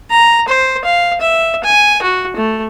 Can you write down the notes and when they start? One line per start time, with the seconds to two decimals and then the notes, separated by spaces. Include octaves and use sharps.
0.10 A#5
0.48 C5
0.85 F5
1.21 E5
1.64 G#5
2.02 F#4
2.37 A3